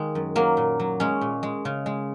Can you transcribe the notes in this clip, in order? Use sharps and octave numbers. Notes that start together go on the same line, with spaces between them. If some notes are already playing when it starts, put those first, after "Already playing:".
Already playing: D#3 G#3 A#3
F#2
F#3 A#3
A#2
F#3
G#3 C#4
A#2
G#3
C#3
G#3